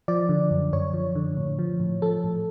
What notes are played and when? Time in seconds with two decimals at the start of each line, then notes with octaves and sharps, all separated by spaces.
0.08 F3 D5
0.29 D3
0.51 F#2
0.73 F#2 C#5
0.93 F3
1.15 D3
1.37 A2
1.59 F3
1.80 A2
2.02 F3 A4
2.24 A2